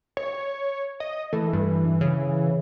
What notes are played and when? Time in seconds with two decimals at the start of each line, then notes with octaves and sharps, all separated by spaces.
0.17 C#5
1.00 D#5
1.33 E3 A3
1.53 G2
2.01 C#3